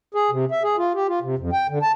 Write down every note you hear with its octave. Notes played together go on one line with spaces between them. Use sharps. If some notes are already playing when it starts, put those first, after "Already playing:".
G#4
C3
E5
G#4
F4
G4
F4
C3
F2
G5
D3
A5